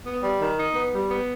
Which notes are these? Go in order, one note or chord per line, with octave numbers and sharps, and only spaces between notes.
B3
G3
D#3
D#4
B3
G3
B3